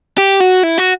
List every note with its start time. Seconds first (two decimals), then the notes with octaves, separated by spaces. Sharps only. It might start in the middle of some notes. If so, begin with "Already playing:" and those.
0.18 G4
0.40 F#4
0.63 E4
0.78 F#4